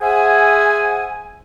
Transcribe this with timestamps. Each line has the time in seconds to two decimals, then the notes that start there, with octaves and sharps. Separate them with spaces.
0.01 G#4 C5 E5 F#5 G#5